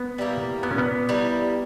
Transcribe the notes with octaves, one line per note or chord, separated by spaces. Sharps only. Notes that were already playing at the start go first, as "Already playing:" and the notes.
Already playing: B3
G3 A#3 E4
A#2 B3
C#4
B3
G3 A#3 E4